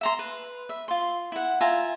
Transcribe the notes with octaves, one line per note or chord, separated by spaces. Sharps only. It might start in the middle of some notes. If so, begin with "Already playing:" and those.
E5 A#5 C6
B4
E5
F4 C6
E4 F#5
F4 E5 G#5 A#5